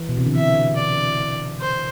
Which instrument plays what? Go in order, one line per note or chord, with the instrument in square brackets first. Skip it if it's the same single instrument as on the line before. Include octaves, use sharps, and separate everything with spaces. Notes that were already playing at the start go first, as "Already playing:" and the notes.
Already playing: [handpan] E3
B2
C3
D3
[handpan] E3 [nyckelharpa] E5
[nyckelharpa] D5
C5